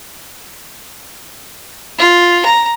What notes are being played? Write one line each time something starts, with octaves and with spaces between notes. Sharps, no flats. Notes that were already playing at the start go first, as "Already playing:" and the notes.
F4
A#5